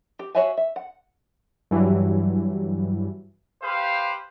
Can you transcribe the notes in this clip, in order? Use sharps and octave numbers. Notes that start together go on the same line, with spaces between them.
G4
F#4 C#5 E5 F5 G#5
E5
F#5
G2 E3 F#3 G3
G4 B4 C5 F5